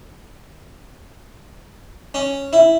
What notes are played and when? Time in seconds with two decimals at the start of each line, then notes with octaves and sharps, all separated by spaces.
2.14 C#4
2.53 E4